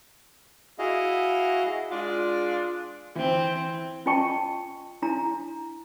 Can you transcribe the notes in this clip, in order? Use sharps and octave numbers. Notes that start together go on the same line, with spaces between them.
E4 F#4 G#4 D#5 F5
G#3 D4 F4
E3 C4
C#4 F4 D#5 G5 A5 C#6
D4 E4 A#5